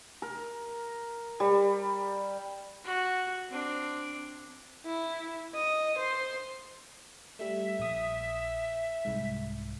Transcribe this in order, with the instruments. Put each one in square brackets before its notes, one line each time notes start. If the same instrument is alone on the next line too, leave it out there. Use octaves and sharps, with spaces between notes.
[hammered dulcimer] A#4
G3
[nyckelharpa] F#4
C4 D4
[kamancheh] E4
D#5
C5 C6
[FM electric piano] G3 A3 [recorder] E5
[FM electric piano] A#1 D#6
C2 G#2